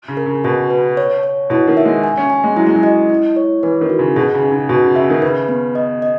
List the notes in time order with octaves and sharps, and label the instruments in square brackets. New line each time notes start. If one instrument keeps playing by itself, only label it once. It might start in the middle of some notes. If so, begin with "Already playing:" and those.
[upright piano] C#3
[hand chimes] A#4
[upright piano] C#3
[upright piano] B2 [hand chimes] F#4
[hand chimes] B4
C#5
C#5
[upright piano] B2 [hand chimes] E4
[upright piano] D#3
[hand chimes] E5
[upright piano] G#3
[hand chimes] G#5
[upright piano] C#4
[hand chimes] G#5
[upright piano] G#3
[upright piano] F#3 [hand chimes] E4
[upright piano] G#3
F#3
[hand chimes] D#5
E4
C#5
[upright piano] E3 [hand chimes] B4
[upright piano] D#3
[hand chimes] F#4
[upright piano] C#3
[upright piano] B2 [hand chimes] G#4
[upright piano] C#3
[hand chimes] D#4
[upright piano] C#3
[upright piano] B2 [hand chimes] F#4
[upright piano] C#3
[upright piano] C#3 [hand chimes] E5
[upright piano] D#3
[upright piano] C#3 [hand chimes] B4
[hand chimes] B3
D#5
D#5